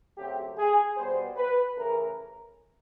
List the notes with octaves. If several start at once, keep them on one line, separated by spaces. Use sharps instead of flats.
C#3 F#3 A3 C4 G4
G#4
B2 G3 B3 C5
B4
C#3 E3 A3 A#4